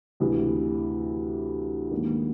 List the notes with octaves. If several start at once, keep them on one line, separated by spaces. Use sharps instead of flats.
D2 C3 E3
G#2 D#3 F#3 A#3 D4